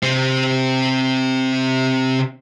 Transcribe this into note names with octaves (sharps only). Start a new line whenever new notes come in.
C3 C4